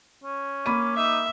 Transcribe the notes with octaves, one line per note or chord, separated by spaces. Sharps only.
C#4
A#3 B5 D6 D#7
D#4 E5